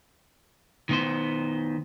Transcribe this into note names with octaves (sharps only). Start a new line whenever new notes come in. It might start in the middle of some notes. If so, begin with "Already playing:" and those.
D#3 B3 C5